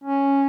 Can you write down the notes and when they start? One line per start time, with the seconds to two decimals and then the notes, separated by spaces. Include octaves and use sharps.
0.04 C#4